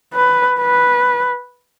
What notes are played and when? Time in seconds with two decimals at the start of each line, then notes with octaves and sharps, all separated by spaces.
0.14 B4
0.60 B4